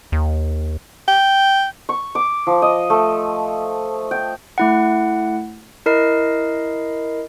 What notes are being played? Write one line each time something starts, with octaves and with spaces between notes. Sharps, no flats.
D#2
G5
C#6
D6
F3
D#5
A3
G5
A3 E4 F#5
E4 A#4 D#5 C7